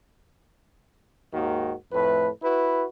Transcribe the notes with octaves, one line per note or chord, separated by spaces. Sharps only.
D#2 G#2 D#3 A#3 F#4
F2 A2 A3 B4
E4 F#4 B4